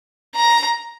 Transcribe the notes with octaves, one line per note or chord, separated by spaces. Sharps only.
A#5